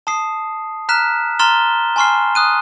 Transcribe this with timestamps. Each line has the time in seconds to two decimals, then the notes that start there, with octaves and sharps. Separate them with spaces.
0.07 A5 D#6 C7
0.89 A#5 F6 F#6 B6 E7
1.39 A#5 C6 F6 A6 E7 G7
1.96 G#5 A5 C6 C#6 F6 C7
2.35 D#6 F#6 D#7